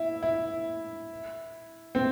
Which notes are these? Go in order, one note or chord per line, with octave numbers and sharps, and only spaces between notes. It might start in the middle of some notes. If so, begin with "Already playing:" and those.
Already playing: E4
E4
C4